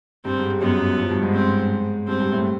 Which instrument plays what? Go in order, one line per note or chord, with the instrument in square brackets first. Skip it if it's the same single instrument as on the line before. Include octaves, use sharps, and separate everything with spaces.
[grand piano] G2 G3 [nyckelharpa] C4
[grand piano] G#2 G#3
[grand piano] F#2 F#3 [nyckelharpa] B3
[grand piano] F3
G2 G3
G#2 G#3
[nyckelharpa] C4
[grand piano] G2 G3 [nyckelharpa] C4
[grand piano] G2 G3
A2 A3